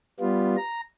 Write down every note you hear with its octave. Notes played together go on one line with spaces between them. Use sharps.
G3 B3 F4
A#5